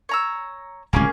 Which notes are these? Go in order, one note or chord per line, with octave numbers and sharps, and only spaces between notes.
C#5 A#5 E6
D1 C#2 A#3 C#4 G#4